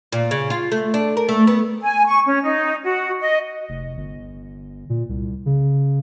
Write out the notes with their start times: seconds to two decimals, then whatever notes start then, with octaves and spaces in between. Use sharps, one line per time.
0.12 A#2
0.31 C#3
0.50 F4
0.72 A3
0.94 D4
1.17 A#4
1.29 A3
1.47 B3
1.81 G#5
2.06 C#6
2.26 C#4
2.42 D#4
2.84 F#4
3.20 D#5
3.69 F1
3.97 G1
4.89 A#2
5.09 C2
5.46 C#3